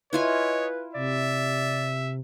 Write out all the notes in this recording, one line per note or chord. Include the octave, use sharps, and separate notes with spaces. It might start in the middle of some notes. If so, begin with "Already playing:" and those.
E4 F4 B4 C#5 D#5 G#5
C3 D5 E5